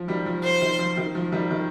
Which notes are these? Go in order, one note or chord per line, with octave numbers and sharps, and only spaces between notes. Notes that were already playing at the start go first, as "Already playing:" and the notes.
Already playing: F3
D#3 G3
F3
C5
D#3
F3
D#3
F3
D#3 G3
D#3